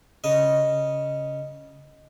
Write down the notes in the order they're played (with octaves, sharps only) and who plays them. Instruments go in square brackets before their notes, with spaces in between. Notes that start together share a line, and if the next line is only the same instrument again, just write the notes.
[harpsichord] C#3 D#5